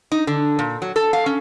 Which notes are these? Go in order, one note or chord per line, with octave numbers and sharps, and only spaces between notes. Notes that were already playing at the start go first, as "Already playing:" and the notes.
D#4
D3
A#2
F#3
A4
F5
C#4